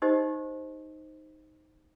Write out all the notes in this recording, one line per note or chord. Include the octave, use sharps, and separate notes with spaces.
D#4 G4 C5 D#5